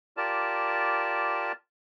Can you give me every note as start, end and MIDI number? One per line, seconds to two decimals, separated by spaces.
0.17 1.52 65
0.17 1.52 67
0.17 1.52 70
0.17 1.52 74
0.17 1.52 81